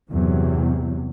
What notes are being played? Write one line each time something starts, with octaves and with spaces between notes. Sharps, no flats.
E2 G2 C3 F#3